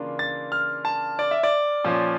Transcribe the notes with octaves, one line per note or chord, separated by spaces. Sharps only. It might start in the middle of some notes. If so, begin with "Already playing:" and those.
Already playing: C#3 E3 A#3 D4 F4
A6
F6
A5
D5
E5
D5
A#2 F3 C#4 F4